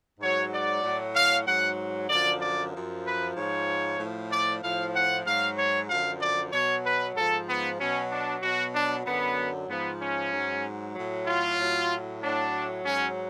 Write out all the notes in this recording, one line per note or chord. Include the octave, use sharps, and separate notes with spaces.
G#2 F#3 C#5
D5
A2 F#3
F5
G#2 F#3 F#5
F#2 D3 F3 D5
D5
F#2 F3
B4
G#2 F3 C#5
A2 F3
D5
A2 F3 F5
F#5
G#2 F#3 F5
C#5
F#2 D3 F3 F5
D5
B2 F#3 C#5
B4
G#2 F3 A4
B3
B2 F#3 C#4
D4
B2 F#3 F#4
D4
F#2 D3 F#3 B3
G#2 F3 B3
C#4
G#2 F#3
A2 F#3
F4
A2 F#3
A2 F#3 D4
G#2 F#3 C#4